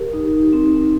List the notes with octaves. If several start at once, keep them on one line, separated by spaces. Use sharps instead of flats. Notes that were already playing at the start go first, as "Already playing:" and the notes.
Already playing: G4 A#4
D#4
C4